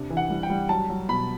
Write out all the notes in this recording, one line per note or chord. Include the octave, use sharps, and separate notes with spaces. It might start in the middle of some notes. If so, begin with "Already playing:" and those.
Already playing: C3 D4
E3
F#5
G3
G5
G3
F#3 A5
F#3
B2 B5